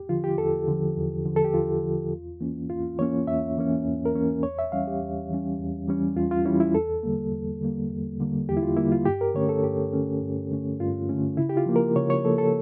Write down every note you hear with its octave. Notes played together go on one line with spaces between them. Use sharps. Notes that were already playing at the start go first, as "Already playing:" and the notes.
Already playing: E2 G4
D3 F3 F4
G4
E2 A4
D3 F3
E2
D3 F3
A4
G4
E2 F4
D3 F3
E2
E3 A#3 C#4
E2 F4
E3 A#3 C#4 C#5
E2 E5
E3 A#3 C#4
E2
A#4
E3 A#3 C#4
E2 C#5
E5
E3 G3 C#4 F5
G4
E2
E3 G3 C#4
E2
E3 G3 C#4
E2 F4
F4
E3 G3 C#4 E4
E4
E2 A4
D3 G3 A#3
E2
D3 G3 A#3
E2
D3 G3 A#3
E2 G4
E4
F4
D3 G3 A#3 E4
F4
G2 G4
A#4
D3 A3 C#4 C#5
A4
G2 G4
D3 A3 C#4
G2
D3 A3 C#4
G2 F4
D3 A3 C#4
C#3 E4
G4
F4
F3 A#3
A#4
C#3 C#5
C#5
F3 A#3 A4
A4